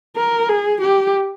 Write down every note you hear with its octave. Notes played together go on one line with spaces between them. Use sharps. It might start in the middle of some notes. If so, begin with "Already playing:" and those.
A#4
G#4
G4